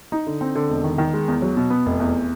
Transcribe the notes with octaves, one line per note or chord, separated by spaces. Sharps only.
D#4
D3
C4
D3
E1
D#3
D#3
G#3
E2
F#3
B2
B3
F1
E2